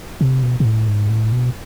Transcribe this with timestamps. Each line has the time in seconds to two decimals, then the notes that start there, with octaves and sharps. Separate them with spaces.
0.21 C3
0.43 B2
0.60 B2
0.65 A2
0.88 G#2
1.09 A2
1.32 B2